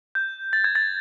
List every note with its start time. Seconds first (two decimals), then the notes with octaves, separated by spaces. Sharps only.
0.15 G6
0.53 A6
0.64 G#6
0.75 A6